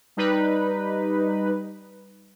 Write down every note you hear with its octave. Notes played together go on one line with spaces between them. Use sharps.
G3 D#4 B4